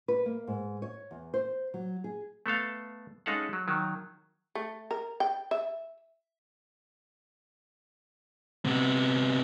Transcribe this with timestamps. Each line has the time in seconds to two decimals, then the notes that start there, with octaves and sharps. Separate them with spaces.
0.08 B4
0.26 A#3
0.47 G#2
0.82 C#5
1.11 E2
1.34 C5
1.74 F#3
2.04 G#4
2.46 A3 B3 A4 F5
3.26 G#3 C#4 D#4 A4 F5 F#5
3.53 F#3
3.68 D#3 F#3
4.55 A3
4.91 A#4
5.20 G5
5.51 E5
8.65 C3 B3